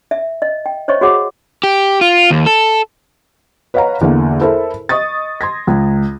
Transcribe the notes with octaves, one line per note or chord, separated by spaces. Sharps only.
E5
D#5
G5
C5 C#5 D#5 E5 C#6
F#4 G#4 C#5 F#5 D6
G4
F4
D#2
A4
B4 C#5 D#5 F5 F#5 A#5
E2 D3 A#3
E4 A4 A#4 C5 E5
D#5 C#6 D#6 A6
C6 G#6 A#6
C#2